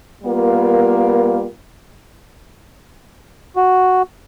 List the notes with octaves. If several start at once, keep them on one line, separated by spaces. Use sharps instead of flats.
G3 A#3 B3 F4 A#4
F#4